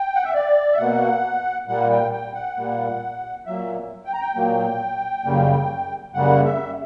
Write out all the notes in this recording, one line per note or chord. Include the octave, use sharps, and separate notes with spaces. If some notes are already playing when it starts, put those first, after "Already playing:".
Already playing: G5
F#5
E5
D5
E5
B2 A#3 F#5
A#2 G3 A#3 F#5
G5
G5
F#5
A#2 G3 A#3
A#2 F#3 A#3 E5
G5
A#5
G5
A#2 F#3 A#3
F#2 C#3 G3 A#3
F#2 C#3 G3 A#3 F#5
E5